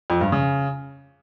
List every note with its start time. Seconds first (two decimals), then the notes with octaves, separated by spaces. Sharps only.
0.10 F2
0.21 G2
0.32 C#3